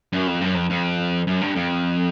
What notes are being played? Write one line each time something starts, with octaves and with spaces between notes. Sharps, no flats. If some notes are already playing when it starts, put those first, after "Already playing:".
F#2
F2
F#2
F2
F2
F#2
G2
F2